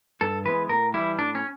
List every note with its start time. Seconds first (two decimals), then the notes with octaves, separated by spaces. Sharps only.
0.21 G2 A4
0.45 E3 G#3 B3 B4
0.69 A2 A#4
0.94 E3 G3 E4
1.18 A2 D4
1.35 C#4